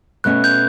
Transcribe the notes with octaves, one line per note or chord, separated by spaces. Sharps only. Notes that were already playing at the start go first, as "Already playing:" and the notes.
B2 A3 C#4 F#6
G6